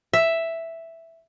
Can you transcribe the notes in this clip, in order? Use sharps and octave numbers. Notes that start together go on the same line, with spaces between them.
E5